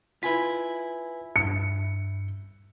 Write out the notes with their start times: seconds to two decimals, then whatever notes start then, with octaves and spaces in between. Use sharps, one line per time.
0.23 E4 F4 B4 G#5 B6
1.36 G2 C#7